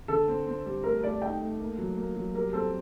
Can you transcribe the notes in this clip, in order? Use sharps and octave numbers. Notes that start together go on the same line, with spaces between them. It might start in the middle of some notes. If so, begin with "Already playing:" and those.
D3 A4
C4
C4
G3
A3 A#4
A3 D5
D#4 G5
A3
A#3
F#3
A#3
F#3
G3 A#4
C4 A4